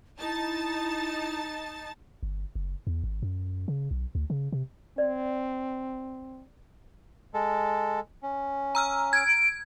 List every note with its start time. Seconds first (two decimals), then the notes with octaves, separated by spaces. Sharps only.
0.18 D#4 E4 A5 A6
2.23 G1
2.55 F#1
2.87 E2
3.04 G#1
3.22 F#2
3.68 C#3
3.91 B1
4.15 D2
4.30 C#3
4.52 C3
4.98 C4 D5
7.34 G#3 A4
8.23 C#4
8.75 A#5 E6 F6
9.13 G#6 D7